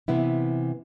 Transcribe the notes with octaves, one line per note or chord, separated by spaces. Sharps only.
C3 E3 B3 E4